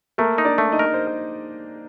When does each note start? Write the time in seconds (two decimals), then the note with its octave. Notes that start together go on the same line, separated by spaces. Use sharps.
0.18 A3 A#3 A#4
0.38 D#4
0.45 D4 D5
0.58 A3
0.72 D#4 D#5
0.79 A#4
0.94 C5